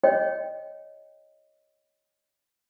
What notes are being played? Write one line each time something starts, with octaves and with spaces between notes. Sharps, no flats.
C#5 D#5 G5